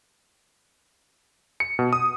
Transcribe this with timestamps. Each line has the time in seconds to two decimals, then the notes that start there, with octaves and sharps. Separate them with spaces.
1.60 C#7
1.79 B2
1.93 D#6